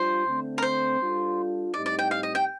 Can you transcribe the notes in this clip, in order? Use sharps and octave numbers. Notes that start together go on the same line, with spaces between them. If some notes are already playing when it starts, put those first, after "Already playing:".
Already playing: G3 D4 F4 C5
D3 A3 C4
A#4
C5
G3 D4 F4 A4
A2 G3 C4 D#4 G4 D5
D5
G5
F5
D#5
G5